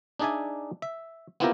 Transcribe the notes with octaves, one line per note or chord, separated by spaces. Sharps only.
D4 D#4 G#4 D5 E5 G#5
E5
B3 C4 E4 F4 G4 A#4